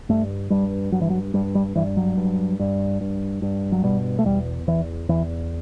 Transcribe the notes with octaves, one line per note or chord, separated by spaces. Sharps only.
G2 A3
G2 G3
G2 F#3
E3
F#3
G2 G3
G3
G2 E3
F#3
G2
G2
G2
G2
F#3
B2 G3
A3
E2 G3
E2 E3
E2 E3